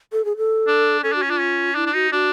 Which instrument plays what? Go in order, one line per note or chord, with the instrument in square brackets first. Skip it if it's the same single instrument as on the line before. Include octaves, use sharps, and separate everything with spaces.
[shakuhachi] A4
G#4
A4
[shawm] D4
[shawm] C#4 [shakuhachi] A4
[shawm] D4
[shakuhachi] F#4
[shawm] C#4
[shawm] D4 [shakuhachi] F4
[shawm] C#4
[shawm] D4 [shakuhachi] E4
[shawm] D4
[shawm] D#4 [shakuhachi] F#4
[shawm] D4 [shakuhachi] F#4